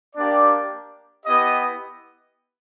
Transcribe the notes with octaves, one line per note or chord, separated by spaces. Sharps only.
A#3 D4 G4 D5
B3 E4 G4 D#5